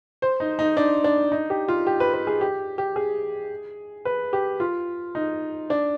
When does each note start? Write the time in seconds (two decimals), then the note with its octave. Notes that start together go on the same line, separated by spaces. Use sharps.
0.22 C5
0.40 D#4
0.59 D#4
0.77 D4
1.04 D4
1.32 D#4
1.50 G4
1.68 F4
1.87 G4
2.00 B4
2.14 B4
2.27 G#4
2.41 G4
2.78 G4
2.96 G#4
4.05 B4
4.33 G4
4.60 F4
5.15 D#4
5.70 D4